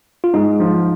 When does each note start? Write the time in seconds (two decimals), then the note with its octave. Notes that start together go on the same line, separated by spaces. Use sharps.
0.24 F4
0.33 G#2 D#4
0.60 F3